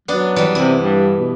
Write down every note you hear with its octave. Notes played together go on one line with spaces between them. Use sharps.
F#3 B3 D4
E3 G3
C3 E4
G2
B2